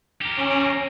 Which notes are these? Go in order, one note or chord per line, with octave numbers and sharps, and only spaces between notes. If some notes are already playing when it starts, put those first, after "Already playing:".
G4 A#4
C#4